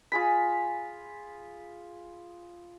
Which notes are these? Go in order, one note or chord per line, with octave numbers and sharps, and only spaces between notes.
F4 G#4 B5